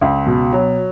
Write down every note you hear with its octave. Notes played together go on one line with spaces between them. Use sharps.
C#2
B2
F#3